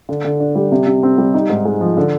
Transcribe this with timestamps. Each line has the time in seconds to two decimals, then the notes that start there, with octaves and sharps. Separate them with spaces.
0.09 D3
0.24 D3
0.40 D4
0.55 G3
0.72 C3
0.87 C3
1.03 C4
1.18 G3
1.34 D#4
1.50 G#2
1.65 G#3
1.81 F3
1.97 D3